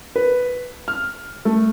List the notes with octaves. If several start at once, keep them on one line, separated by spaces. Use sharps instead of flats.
B4
F6
A3